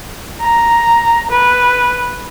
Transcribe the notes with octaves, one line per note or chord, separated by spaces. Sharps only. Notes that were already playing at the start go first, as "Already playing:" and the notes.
A#5
B4